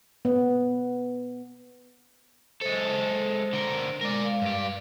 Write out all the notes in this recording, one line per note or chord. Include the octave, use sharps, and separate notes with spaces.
B3
G#3 A4 C5
D3 A#4
G#3 A#4 D5
F5
G2 G4